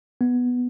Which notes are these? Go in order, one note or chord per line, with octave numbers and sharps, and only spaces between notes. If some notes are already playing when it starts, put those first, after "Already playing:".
B3